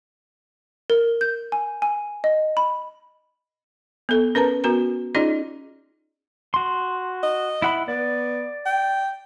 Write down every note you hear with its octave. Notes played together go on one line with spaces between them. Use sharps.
A#4
G6
G#5
G#5
D#5
B5
B3 A4
C#4 A#4 B4 A5 A#5
B3 F#4 A#4 A#5
C#4 D#4 F4 G#4 D5 D#5
F#4 C6
D#5
E4 F#5 B5
B3 D5
G5